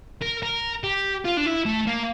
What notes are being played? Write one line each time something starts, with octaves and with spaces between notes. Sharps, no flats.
A#4
A#4
G4
F4
D4
E4
A3
A#3